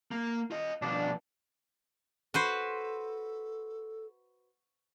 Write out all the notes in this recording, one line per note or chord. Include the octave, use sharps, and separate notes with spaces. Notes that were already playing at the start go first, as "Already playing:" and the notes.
A#3
F4 D#5
B2 F3 D4
F#4 A4 B4 C5